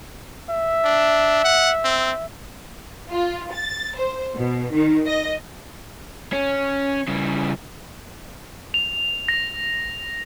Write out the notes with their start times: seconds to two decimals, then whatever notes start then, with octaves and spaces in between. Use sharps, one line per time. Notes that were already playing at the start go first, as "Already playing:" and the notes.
0.50 E5
0.85 D4
1.44 F#5
1.84 C4
3.11 F4
3.51 A6
3.96 C5
4.34 B2
4.72 D#3
5.06 D#5
6.33 C#4
7.08 C#3 G3
8.74 F7
9.28 A#6